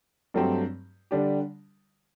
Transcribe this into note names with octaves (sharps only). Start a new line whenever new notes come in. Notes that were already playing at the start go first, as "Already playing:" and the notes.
G2 F#3 A3 C4 G4
D3 G3 D4 G4